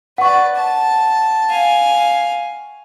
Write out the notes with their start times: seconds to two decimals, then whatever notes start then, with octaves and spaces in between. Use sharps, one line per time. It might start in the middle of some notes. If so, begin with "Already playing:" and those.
0.18 B4 D5 F#5 C#6
0.56 A5
1.49 F5 G#5